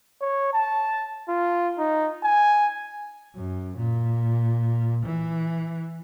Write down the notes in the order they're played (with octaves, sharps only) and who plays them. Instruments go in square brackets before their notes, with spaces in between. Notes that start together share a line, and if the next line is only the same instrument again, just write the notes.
[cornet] C#5
A5
F4
D#4
G#5
[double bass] F#2
A#2
E3